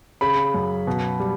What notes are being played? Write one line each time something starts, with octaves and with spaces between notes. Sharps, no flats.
C#3 B5
F#2
B2
G3